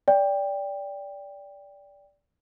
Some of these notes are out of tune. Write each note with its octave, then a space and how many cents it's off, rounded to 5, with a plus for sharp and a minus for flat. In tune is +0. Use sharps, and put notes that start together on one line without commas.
D5 -20 G5 +15